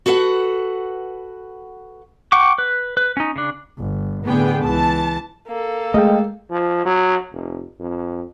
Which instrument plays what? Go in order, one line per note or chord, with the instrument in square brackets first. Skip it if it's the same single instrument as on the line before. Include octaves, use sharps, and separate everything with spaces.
[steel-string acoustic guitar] F#4 A4 B4 D#5 F#5
[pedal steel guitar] F#5 G5 C#6 D6
B4
B4
C#4 D#4
C#3 D4
[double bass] G1
[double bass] A2 D3 [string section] B3 G#4 G5
[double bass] C#2 E3 [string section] A5
[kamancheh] A#3 A4
[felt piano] G#3 [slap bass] A3 [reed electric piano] D#5 F5 G5
[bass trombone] F3
F#3
F1
F2